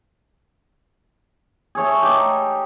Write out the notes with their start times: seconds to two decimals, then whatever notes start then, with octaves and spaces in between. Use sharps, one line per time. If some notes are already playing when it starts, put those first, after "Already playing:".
1.75 G#4 A4 C#5 E5
2.03 D#4 G4